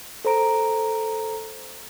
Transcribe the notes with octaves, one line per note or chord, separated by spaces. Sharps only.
A4 C5 A#5 D7